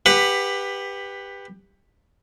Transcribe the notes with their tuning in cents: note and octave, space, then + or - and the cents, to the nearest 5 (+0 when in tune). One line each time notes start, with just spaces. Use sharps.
G4 +20 B4 +0 F#5 +0